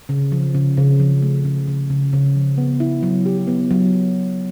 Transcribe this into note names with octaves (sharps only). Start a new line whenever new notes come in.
C#3
F3
C#3
C#3
F3
A3
C#3
C#3
C#3
C#3
F3
B3
E4
F#3
G4
B3
F#3